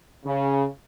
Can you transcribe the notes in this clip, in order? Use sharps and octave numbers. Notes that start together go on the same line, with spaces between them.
C#3